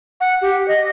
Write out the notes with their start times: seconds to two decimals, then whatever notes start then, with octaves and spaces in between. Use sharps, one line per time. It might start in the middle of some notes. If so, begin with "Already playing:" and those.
0.21 F#5
0.42 G4
0.68 D#5